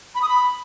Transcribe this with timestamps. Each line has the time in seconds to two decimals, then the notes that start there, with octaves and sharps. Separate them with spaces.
0.15 B5
0.22 D#6
0.29 B5